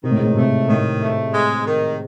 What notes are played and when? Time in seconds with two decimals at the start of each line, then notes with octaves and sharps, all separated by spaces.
0.04 C3 D#3
0.11 A2
0.18 G#2
0.25 A2
0.36 C3 A3
0.68 A2 D#3
1.02 A3
1.33 G#3
1.66 D#3